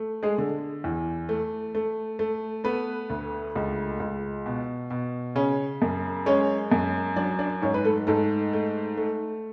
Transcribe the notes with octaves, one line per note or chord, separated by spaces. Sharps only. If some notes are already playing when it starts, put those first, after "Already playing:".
Already playing: A3
G#3 G#4
D3
E2
A3
A3
A3
A3 B3 B4
D2
C#2
C#2
B2
B2
C#3 C#4 C#5
F#2
G#3 C#4 C#5
F#2
F#3 D4 D5
D4 D5
G#2 C#4 C#5
B4
A3 A4
G#2 A3 A4
A3
A3